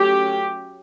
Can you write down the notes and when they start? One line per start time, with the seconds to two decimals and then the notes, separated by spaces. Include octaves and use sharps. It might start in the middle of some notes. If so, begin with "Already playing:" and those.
Already playing: F#3 A3 C#4 G4